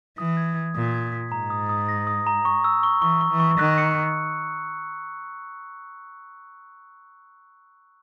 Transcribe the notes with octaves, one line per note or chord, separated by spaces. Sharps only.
E3 D#6
G#6
G#6
A#2 D#6
G#6
B6
G#2 A#5
D#6
D#6
A#6
D#6
A#5
C#6
E6
C#6
E3 C#6
C#6
E3
C#6
D#3 F#6
C#7